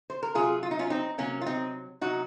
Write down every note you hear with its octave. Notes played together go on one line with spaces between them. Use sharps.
C5
A#4
C3 F#3 F4 G#4
F4
D#4
C#4 F4
C4 D#4
C3 F#3 A#3 C#4
F4
C4 D#4
C3 F#3 D#4 F#4